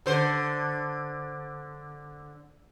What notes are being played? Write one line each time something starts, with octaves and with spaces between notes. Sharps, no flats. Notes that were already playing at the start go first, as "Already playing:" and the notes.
D3 C5